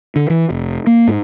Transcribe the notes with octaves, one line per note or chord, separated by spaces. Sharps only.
D3
E3
F1
A#3
G#2